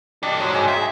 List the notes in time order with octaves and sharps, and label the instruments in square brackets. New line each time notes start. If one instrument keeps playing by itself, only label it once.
[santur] D4 D6 [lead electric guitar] G4 D#5
[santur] F#3 [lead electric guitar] D#4 C5
[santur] G#4 D#5 G5
[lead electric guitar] E5 [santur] G5